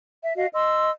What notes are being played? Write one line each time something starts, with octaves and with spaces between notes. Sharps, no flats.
E5
F#4 D#5 F5
D#5 C6 E6